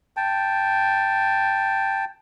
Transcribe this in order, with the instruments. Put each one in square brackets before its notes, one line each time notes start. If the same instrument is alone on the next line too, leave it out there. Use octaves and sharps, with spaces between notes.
[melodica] G5 A5